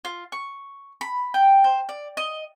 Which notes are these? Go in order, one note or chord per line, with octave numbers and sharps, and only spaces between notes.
F4
C#6
B5
G5
C5
D5
D#5